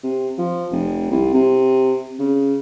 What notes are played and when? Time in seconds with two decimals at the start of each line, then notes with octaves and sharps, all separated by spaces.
0.03 C3
0.38 F3
0.71 F1
1.11 C2
1.34 C3
2.19 C#3